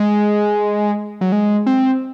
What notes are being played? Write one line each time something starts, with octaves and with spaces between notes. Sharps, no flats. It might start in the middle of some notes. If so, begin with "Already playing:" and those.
Already playing: G#3
F#3
G#3
C4